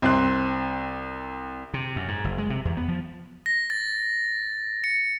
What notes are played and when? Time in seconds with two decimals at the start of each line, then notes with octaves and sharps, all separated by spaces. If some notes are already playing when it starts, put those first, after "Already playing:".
0.02 C2 C4 C6 F#6
1.74 C3
1.96 F#2
2.08 G#2
2.24 F#1
2.38 G#3
2.50 C3
2.65 E2
2.77 B3
2.88 F3
3.46 A#6
3.70 A6
4.84 C#7